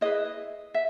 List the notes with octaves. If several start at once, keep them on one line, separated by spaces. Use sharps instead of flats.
E4 G#4 B4 D#5
E5